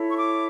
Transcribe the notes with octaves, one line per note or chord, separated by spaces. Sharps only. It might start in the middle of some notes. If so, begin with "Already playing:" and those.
Already playing: E4 A4 C#5
C#6
D6